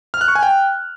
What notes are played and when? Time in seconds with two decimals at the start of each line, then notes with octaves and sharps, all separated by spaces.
0.14 F6
0.21 F#6
0.28 C#6
0.35 G#5
0.43 G5